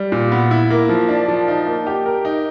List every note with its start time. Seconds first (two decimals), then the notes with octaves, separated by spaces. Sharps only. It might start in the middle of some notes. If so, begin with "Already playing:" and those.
Already playing: G3
0.12 A#2
0.32 B3
0.51 E4
0.70 A#3
0.89 F3
1.09 D4
1.28 F3
1.48 D#4
1.67 A#3
1.87 G4
2.06 A#4
2.25 D#4